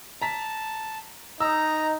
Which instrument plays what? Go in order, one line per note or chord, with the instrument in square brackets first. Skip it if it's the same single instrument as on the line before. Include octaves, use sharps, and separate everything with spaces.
[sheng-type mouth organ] A5 [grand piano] A#5 B6
[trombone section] D#4 [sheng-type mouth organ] A#5 [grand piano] E6